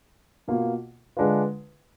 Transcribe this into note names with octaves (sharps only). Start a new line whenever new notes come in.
B2 A#3 F4
D3 G#3 D4 F4 B4